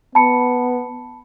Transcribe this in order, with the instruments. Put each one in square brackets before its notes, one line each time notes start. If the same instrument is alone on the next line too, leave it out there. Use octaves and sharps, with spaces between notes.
[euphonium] B3 [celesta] A5 B5 C#7